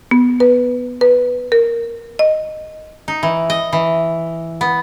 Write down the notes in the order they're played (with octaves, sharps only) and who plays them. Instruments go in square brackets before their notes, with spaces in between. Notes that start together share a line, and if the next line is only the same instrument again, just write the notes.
[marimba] B3
B4
B4
A#4
D#5
[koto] D#4
E3
D#5
E3
B3